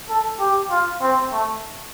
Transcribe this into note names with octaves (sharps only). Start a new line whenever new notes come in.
A4
G4
F4
C4
A3